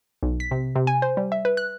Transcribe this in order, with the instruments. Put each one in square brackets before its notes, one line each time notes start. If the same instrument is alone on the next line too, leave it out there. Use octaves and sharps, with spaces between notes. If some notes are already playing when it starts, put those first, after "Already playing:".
[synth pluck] B1
B6
C3
C3
G#5
C5
G3
E5
B4
F#6